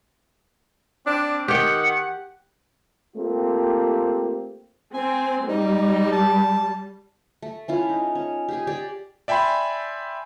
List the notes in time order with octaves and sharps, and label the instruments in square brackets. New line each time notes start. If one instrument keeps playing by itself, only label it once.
[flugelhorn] C4 [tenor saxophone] D4 [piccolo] D6
[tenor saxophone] D#3 [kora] G4 G5 [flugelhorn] F#5 [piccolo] C#7
[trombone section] A3 A#3 C4 F4 G4
[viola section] C4 [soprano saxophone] G#5
[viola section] G3 [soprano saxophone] D#4
[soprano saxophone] A5
[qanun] A3
C#4 E4 F4
D#4
C#4
G4 G#4 G#5
G4 G#4 D5
[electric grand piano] D5 E5 G5 G#5 B5 C6